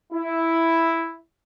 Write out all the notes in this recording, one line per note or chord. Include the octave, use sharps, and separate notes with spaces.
E4